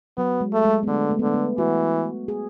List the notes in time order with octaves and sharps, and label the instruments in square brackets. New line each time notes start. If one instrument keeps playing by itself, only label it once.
[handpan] F#3 [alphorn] B3
[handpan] G#3
[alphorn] A3
[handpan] G#3
B3
[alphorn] D3 [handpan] A3
[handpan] A3
B3
[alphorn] D3 [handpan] A3
[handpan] B3
[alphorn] E3 [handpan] F#4
[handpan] G#4